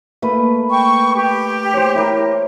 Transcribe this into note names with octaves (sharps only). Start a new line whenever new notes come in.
A3 A#3 B4
G5 C#6
G4
C5 C#5
E4 A#4